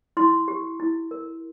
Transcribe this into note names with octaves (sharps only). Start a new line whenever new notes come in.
E4 C6
G4
E4
A#4